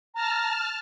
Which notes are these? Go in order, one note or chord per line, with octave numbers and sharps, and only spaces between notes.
A5 A#5 F6